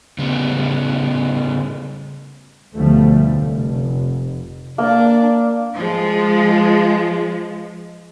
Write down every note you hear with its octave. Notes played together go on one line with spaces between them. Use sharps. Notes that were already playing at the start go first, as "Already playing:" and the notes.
C#3 G3 A3 B3
D2 B2 D3 F3 G3 A3
F1
A#3 D4 D5
F3 G#3